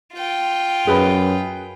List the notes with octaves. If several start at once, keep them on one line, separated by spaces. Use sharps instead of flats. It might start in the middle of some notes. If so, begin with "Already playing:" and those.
F4 G5
F#2 G#4 B4 B5